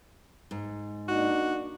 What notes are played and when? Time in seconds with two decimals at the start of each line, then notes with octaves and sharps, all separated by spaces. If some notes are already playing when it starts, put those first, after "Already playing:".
0.51 G#2
1.08 A#3 D4 D#4 F#4